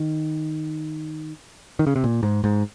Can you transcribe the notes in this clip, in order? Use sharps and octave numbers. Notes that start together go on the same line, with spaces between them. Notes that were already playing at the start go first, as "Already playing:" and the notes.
Already playing: D#3
D#3
C#3
C3
A#2
G#2
G#2